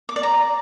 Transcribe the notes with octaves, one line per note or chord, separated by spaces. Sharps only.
D6
D5
A#5